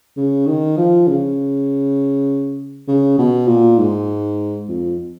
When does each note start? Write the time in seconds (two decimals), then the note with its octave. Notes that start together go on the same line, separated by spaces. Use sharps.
0.17 C#3
0.47 D#3
0.77 F3
1.08 C#3
2.88 C#3
3.19 B2
3.48 A#2
3.78 G#2
4.68 F2